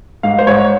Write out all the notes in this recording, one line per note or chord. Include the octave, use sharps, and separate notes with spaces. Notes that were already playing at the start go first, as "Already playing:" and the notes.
G#2 F5
C5
G#2 C#5